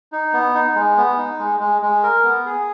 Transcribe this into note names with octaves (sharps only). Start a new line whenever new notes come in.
D#4
B3
D#4
G#3
B3
D#4
G#3
G#3
G#3
A#4
B3
G#4